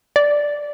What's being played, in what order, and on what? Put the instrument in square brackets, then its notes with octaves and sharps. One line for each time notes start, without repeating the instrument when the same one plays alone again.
[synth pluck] D5